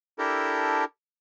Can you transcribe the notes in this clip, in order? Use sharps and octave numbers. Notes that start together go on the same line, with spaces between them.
D4 E4 G4 A4 A#4